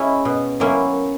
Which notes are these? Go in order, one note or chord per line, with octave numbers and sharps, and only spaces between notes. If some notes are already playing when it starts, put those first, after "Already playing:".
Already playing: G#3 C#4 E4
B2
F#3 A#3 C#4 E4